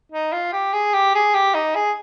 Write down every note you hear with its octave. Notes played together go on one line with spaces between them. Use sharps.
D#4
F4
G4
G#4
G4
G#4
G4
D#4
G#4